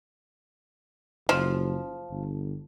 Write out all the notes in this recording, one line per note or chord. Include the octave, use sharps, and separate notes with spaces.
F#1 F3
G1